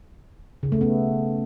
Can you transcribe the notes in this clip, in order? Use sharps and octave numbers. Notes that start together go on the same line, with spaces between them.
C#3
A3
B3